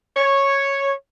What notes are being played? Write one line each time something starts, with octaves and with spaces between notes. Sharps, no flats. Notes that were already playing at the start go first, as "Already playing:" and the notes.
C#5